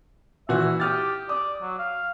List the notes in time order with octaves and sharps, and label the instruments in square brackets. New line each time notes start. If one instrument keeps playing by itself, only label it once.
[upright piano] A#2 E3 F#4 [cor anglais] E5
[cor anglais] G4 [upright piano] D#6 F6 A6
[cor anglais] D5 [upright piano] D#6
[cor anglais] F#3
F5